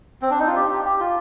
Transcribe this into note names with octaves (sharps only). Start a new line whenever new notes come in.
C4
D4
D#4
F4
G4
G4
G4
F4